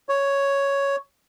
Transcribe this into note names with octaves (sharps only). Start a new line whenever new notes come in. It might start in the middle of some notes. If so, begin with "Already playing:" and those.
C#5